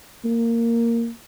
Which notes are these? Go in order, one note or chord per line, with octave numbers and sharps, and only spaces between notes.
A#3